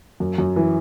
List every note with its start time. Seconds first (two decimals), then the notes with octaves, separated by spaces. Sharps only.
0.20 F#2
0.38 F#2
0.56 E3